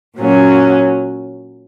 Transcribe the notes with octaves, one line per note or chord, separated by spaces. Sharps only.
A#2 F#3 C#4